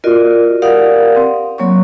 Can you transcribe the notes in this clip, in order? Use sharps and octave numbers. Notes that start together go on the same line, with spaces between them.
F4 F#4 A#4 D5 D#5
G4 A#4 D5 F5 F#5 D#6
C4
F#3 A#3 C#5 C#6